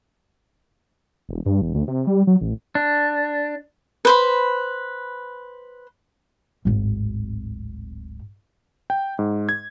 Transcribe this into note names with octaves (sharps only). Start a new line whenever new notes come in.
E1
G2
E1
D2
C3
G3
F#3
A1
D4
B4 C5 B5
D1 G#1
G5
G#2
G#6